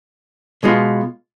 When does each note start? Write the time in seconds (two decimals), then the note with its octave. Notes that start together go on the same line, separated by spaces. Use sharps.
0.63 B2 G#3 B3 F4